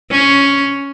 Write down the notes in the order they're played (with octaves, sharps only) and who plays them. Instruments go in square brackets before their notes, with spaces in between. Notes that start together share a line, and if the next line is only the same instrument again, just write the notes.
[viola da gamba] C#4